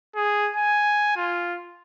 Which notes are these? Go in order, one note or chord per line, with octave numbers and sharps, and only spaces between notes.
G#4
G#5
F4